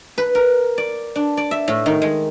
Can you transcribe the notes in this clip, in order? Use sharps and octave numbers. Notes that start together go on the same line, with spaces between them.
B4
A#4
D5
D4
D5
E5
A2
D#3
G#3